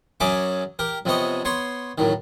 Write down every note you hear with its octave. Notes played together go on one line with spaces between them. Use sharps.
F#2 F#3 C#4 G#4 E5 D6
G4 A#4
F2 C3 B3 C#5 D#5
B3 C#5 C6 C#6
F#2 A2 D#3